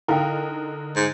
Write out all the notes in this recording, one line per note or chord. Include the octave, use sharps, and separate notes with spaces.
D3 D#4 E4 A#4 F5 G5
G#2